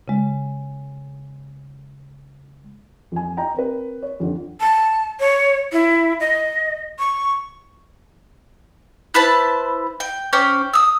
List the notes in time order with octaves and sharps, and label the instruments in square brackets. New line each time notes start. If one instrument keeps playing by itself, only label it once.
[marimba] C#3 G#3
[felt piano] F2 G#5
D#5 G5 A#5
C4 A#4 B4
C#5
F2 D3
[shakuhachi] A5
C#5
E4
D#5
C#6
[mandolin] E4 B4 C5 A5
G5
C#4 C5 G5 D6
D#6 E6